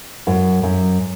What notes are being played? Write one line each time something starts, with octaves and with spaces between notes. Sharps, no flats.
F#2
F#2